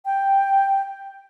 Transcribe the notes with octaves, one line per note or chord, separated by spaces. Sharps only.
G5